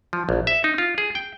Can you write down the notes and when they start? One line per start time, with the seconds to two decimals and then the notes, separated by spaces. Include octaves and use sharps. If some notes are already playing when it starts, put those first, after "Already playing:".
0.13 F3
0.29 A#1
0.47 E5
0.64 D#4
0.78 F4
0.98 G#4
1.15 G5